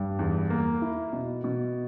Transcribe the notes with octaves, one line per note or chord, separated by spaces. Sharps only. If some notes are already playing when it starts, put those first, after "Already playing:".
Already playing: G2
E2
A#3
E4
B2
B2